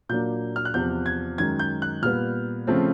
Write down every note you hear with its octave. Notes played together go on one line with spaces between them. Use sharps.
A#2 F#3 A#3 D4 G6
F6
F#6
E2 C3 F3 G6
G#6
F#2 D#3 G#3 G#6
G6
F#6
A#2 G3 B3 F6
C#3 F3 A3 C4